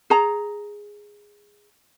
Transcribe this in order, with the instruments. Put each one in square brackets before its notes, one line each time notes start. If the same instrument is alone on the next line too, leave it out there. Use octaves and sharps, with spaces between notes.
[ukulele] G#4 A#5